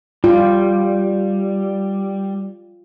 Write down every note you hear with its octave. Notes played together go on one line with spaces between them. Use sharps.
G3 F4